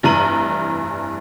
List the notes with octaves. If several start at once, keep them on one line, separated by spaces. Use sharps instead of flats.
F1 G2 E3 A#5 D#7 F#7